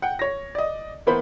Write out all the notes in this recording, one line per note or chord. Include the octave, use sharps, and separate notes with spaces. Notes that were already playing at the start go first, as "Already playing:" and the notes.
F#5 G5
C#5 A#6
D5 D#5
E3 A#3 B3 C5 B5 G6